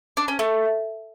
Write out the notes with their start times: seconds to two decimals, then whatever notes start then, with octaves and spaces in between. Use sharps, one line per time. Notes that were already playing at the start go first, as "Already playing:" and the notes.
0.17 D4
0.28 C#4
0.39 A3